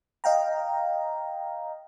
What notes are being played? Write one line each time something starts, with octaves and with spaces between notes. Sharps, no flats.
D#5 F5 G5 A#5